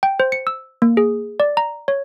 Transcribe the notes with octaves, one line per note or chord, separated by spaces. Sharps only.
G5
C5
C#7
E6
A#3
G#4
D5
A#5
C#5